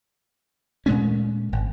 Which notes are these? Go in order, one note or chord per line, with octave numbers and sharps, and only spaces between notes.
A#2 G#3 A3 C#4
G#1